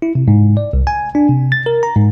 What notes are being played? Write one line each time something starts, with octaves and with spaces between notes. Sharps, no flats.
E4
C3
G#2
D5
C2
G#5
D4
C3
A6
A#4
A#5
G#2